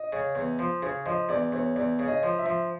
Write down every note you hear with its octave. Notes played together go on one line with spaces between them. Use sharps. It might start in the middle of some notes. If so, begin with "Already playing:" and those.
Already playing: D#5
C#3
E2
F3
C#3 C#5
F3 D#5
E2 D5
E2 C#5
E2 D5
C#3
D#5
F3
E5
F3